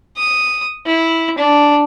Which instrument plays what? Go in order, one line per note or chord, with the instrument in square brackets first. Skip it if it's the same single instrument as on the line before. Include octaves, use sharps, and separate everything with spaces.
[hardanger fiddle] D#6
E4
D4